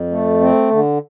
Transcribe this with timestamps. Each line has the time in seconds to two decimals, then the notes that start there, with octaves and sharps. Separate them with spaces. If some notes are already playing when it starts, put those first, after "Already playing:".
Already playing: F2
0.11 A3
0.41 C4
0.70 D3